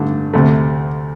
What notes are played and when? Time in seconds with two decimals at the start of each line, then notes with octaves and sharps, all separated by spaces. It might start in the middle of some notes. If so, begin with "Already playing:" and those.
Already playing: G2 D3 A3 D4
0.34 D2 C3 A3